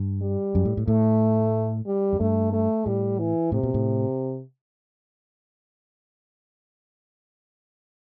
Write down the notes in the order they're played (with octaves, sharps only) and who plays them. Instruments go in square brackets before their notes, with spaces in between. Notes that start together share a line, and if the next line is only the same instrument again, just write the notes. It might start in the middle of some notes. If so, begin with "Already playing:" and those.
Already playing: [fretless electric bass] G2
[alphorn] G3
[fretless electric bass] F#2
A2
A2
[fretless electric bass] A2 [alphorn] A3
[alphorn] G3
[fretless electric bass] F#2
[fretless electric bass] G2 [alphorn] A3
[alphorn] A3
[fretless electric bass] A2 [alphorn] G3
[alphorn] E3
[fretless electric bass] A2 [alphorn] C3
[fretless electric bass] B2
A2